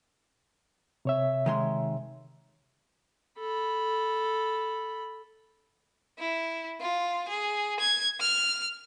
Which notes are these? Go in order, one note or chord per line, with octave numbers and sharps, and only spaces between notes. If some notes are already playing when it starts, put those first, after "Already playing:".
C3 C#5 E5
D#3 G#3 C6
A4 B5
E4
F4
G#4
G#6
F6